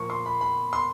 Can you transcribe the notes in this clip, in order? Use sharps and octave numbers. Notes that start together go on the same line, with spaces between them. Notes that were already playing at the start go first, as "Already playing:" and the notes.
Already playing: A#2 F3 A#3 C#6
C6
B5
B5
C6